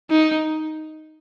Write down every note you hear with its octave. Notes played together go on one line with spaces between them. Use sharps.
D#4